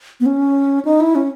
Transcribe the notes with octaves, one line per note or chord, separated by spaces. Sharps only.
B3
C#4
D#4
E4
C#4